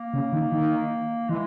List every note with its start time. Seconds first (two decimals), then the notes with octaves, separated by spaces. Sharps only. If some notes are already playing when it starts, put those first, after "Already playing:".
Already playing: A#3
0.14 C#3
0.33 D#3
0.52 D#3
1.29 E3 G#3